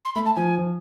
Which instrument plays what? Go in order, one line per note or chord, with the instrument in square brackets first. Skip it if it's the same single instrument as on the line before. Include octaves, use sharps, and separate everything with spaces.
[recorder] C6
[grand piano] A3 [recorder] B5
[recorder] A5
[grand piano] F3 [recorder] G#5
[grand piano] F3